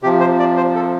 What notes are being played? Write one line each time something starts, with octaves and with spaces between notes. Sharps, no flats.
C3 F3 G4
C5
D5
C5
A4